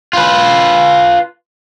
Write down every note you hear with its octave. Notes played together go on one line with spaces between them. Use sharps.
F4 B4